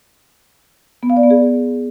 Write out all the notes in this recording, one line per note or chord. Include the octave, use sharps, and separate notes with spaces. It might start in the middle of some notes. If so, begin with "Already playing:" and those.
B3
F5
D5
B3
G#4